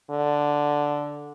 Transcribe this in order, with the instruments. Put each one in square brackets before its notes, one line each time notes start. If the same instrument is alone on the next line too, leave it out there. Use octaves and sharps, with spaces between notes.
[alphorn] D3